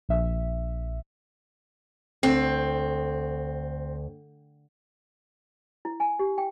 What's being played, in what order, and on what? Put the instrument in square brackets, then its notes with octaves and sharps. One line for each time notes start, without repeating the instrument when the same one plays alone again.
[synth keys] A#1 E5
[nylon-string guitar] D2 [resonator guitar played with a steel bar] C4
[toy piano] E4
G#5
G4
G5